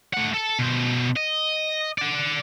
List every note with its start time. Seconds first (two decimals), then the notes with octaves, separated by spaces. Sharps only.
0.14 A2 F#5
0.34 A4 A5
0.59 B2 C5
1.16 D#5
1.98 D5 F#5